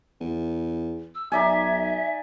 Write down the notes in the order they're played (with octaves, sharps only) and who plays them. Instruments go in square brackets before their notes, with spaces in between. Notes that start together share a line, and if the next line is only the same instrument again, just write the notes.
[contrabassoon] E2
[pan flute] E6
[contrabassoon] B1 [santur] D#4 D5 G#5 [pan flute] E5